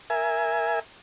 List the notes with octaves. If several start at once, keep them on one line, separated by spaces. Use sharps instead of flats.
A#4 E5 G#5